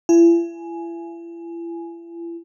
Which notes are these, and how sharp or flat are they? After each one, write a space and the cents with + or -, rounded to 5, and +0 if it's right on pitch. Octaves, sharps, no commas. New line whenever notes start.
E4 +40 G#5 +10